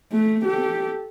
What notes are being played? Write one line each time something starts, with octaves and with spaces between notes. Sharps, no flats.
A3
G4 A4